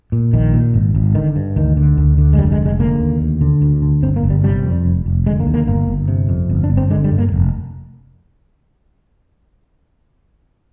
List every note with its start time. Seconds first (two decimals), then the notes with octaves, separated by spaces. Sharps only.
0.12 A#2
0.33 A#1 D#3
0.53 A#2
0.74 G#1
0.94 G#1
1.15 D3 D#3
1.36 G2
1.56 D2 D#3
1.77 D3
1.97 D2
2.18 D3
2.33 G#3
2.38 F1 G3
2.52 G#3
2.59 F1
2.66 G#3
2.80 D3 A#3
3.00 D#2
3.20 D2
3.41 D3
3.62 D2
3.82 D3
4.02 G1 C4
4.16 A#3
4.23 G1
4.30 G3
4.44 C3 G3
4.64 F2
4.85 F1
5.06 F1
5.27 D3 G#3
5.40 A#3
5.47 D#2
5.54 A#3
5.67 G1 A#3
5.88 G1
6.08 C3
6.29 F2
6.49 G1
6.64 D4
6.70 G1
6.77 C4
6.90 D3 G#3
7.04 G3
7.11 G2
7.18 A#3
7.32 F1